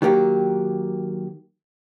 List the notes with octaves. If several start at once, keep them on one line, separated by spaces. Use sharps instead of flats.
D#3 F#3 A#3 G4